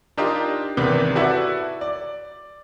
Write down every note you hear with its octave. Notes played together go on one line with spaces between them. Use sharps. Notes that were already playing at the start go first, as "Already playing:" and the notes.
D4 D#4 F4 G4 A#4 D#5
G#1 E2 C3 D#3 B4 G6
E4 F#4 A4 B4 D5 E5
D5